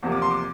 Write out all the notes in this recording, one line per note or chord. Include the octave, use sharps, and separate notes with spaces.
E2 C3 F3 A#3
D6
C6
D6